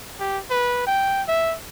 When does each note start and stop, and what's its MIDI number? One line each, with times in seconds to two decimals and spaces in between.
0.20 0.38 67
0.50 0.84 71
0.87 1.22 79
1.28 1.55 76